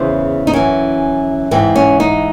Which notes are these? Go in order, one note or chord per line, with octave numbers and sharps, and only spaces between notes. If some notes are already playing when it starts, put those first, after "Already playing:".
Already playing: E2 C#3 E3 C5
D#4
F#2 E3 C#4
G#2 E3 C4
C#4
D#4